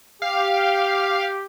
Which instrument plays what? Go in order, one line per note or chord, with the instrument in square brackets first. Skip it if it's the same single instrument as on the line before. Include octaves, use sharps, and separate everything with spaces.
[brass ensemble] G4 [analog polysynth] F5